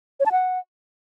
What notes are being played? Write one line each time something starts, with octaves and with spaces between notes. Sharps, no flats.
C#5
A5
F#5